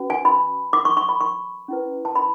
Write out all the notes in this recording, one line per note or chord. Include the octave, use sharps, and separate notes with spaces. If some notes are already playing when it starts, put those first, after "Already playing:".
Already playing: C#4 F#4 B4
G#5
B5
D6
C#6
C#6
B5
C#6
C#4 E4 B4
A5
B5